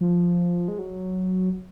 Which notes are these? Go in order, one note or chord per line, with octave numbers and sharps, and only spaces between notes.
F3
G#3
F#3